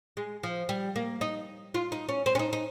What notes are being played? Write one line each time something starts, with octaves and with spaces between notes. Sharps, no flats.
G#3
F3
G3
A#3
D#4
F4
D#4
C#4
C4
C#4
D#4
D#4